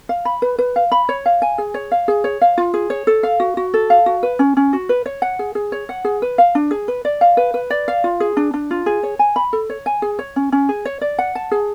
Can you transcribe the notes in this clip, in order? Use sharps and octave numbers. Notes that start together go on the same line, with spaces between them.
F5
B5
B4
B4
F5
B5
C#5
F5
G#5
G#4
C#5
F5
G#4
C#5
F5
F4
G#4
C#5
A4
F5
F#4
F#4
A4
F5
F#4
B4
C#4
C#4
F#4
B4
C#5
F#5
G#4
G#4
C#5
F#5
G#4
B4
F5
D4
G#4
B4
D5
F5
B4
B4
D5
F5
F4
G#4
D4
D4
F4
G#4
C#5
G#5
B5
A4
C#5
G#5
G#4
C#5
C#4
C#4
G#4
C#5
D5
F#5
A5
G#4